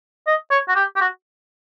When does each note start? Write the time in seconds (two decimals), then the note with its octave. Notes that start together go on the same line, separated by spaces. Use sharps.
0.27 D#5
0.51 C#5
0.69 F#4
0.76 G4
0.96 G4
1.01 F#4